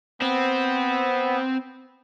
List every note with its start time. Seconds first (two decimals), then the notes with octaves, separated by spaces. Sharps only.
0.22 B3 C4